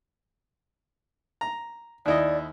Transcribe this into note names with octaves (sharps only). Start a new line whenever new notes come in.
A#5
D#2 E4 D5 D#5